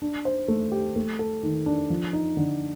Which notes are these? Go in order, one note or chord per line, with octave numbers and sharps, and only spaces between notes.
D4
C5
A3
G4
A3
A4
D#3
D4
F3
D#4
D3